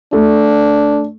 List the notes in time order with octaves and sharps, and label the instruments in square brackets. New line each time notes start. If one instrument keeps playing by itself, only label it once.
[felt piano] A3 [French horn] D4